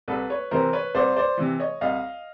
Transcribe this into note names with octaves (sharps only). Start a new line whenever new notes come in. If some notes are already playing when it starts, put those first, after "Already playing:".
C2 A4 B4
B4 C#5
C3 E3 A#4 C5
B4 C#5
C2 C5 D5
C5 D5
C3 E3
C#5 D#5
C2 D#5 F5